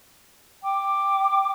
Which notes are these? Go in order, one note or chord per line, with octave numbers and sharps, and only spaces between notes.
G5 D6